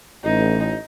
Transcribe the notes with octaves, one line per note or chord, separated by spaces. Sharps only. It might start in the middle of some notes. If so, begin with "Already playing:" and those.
A1 D#4